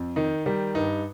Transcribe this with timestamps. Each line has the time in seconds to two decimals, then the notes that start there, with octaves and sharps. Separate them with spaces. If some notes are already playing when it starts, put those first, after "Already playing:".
Already playing: F2
0.16 D#3 D#4
0.46 D#3 G3
0.75 G2 D#4